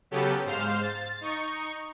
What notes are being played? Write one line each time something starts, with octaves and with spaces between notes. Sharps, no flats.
C#3 F#3 B3 C#4 G4 A4
G#2 C5 F5 F6
A6
D#4 C#6